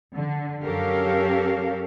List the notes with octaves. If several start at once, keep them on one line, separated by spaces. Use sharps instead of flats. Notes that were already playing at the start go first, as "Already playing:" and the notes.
D3
F#2 C#4 G4 A4 A#4 F5